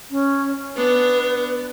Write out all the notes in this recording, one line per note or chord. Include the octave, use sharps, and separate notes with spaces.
C#4
B3 D4 B4